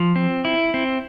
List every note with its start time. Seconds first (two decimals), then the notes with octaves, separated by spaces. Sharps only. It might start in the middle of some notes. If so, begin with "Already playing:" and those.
Already playing: F3
0.16 C4
0.45 E4
0.74 C4